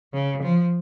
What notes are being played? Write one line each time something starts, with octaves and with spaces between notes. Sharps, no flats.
C#3
F3